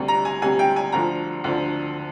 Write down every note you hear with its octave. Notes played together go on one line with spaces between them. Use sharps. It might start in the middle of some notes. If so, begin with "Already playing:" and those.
Already playing: D2 C3 G3
A#5
G#5
D2 C3 G3 G#5
G5
G#5
D2 D3 F3 A#5
D2 D3 F3